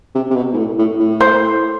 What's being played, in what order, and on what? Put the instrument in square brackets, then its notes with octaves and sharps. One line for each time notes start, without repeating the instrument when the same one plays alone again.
[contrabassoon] C3
C3
B2
G#2
A2
A2
A2
[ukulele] C5